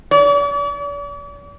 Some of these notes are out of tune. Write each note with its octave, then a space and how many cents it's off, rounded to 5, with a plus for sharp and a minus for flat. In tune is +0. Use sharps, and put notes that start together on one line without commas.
D5 -45